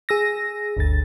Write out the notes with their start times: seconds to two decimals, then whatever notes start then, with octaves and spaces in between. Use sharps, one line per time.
0.09 G#4 E6 A#6
0.77 G1 D2 A6